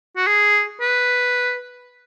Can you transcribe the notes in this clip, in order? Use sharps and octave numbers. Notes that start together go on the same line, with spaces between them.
F#4
G#4
B4